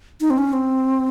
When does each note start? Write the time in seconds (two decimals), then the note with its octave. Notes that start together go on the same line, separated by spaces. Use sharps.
0.21 D#4
0.30 C4
0.38 C#4
0.53 C4